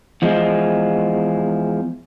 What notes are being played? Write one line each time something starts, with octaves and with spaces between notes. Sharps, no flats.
E2 F3 G#3